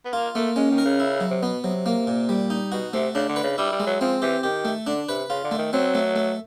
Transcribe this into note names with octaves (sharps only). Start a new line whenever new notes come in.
B3
A#3 F4
A3 A#3
G#3 C#4
D#3
A#4
C#3
E4
F#3
C3
B2 B3
C3 F#3
A#3
A#2
G3
D#4
B2 F#4
C3 A3
C#3 D4
D3
B4
C#3
G3 E4
G3
G#3
F#3
F3 C4
E3 G4
D#3 G4
A3
D3 D4
C3 B4
C#3 F4
D3
A3
D#3
F#3 C4
A3
A3